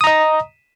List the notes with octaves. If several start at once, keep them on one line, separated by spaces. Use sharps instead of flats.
D#5 A#5 D#6